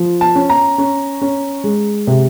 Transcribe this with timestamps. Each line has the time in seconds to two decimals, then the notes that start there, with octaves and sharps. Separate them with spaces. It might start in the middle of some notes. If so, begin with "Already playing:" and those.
Already playing: F3
0.21 A5
0.35 C#4
0.50 A#5
0.78 C#4
1.22 C#4
1.64 G#3
2.07 C3